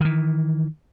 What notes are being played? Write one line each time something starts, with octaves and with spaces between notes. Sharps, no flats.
D#3 E3